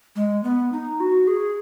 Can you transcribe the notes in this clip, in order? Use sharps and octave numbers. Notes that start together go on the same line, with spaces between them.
G#3
B3
D#4
F#4
G#4